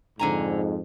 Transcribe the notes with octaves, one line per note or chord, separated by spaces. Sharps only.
F2 G#2 D3 G#5 A#5